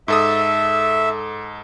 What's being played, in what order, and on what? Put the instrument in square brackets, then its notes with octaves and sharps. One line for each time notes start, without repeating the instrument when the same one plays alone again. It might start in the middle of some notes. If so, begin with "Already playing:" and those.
[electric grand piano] G#2 A4 D#6 [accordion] E5